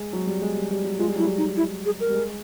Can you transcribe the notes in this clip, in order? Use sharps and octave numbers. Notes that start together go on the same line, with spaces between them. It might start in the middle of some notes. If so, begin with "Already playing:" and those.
Already playing: G#3
F#3
G3
G#3
G3
G3
F#3
G#3 F4
G3
F#3 E4
G3
D#4
E4
G#4
A#4
G3
G#3